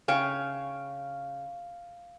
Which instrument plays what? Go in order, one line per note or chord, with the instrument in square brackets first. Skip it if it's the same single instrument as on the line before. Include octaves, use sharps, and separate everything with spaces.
[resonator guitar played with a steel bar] C#3 C#5 G5 [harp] F5